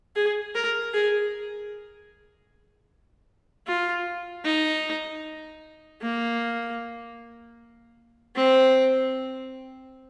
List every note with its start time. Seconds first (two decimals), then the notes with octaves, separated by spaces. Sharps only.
0.16 G#4
0.55 A#4
0.94 G#4
3.67 F4
4.45 D#4
6.02 A#3
8.36 C4